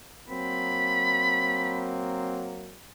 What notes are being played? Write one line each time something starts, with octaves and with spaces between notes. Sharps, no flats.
F#3 A#3 C4 B5